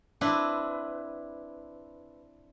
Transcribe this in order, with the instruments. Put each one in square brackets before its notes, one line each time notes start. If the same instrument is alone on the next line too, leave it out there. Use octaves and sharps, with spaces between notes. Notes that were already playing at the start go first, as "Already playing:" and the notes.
[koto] C4 D4 E4 B4